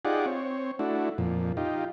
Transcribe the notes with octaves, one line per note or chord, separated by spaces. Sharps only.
D#4 F4 G4 G#4 D5 F#5
C4 C#5
A3 D4 E4 F#4
F2 A#2
D#4 F4 G4